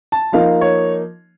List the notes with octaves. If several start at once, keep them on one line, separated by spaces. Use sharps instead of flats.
A5
F3 A#3 D#4 F5
C#5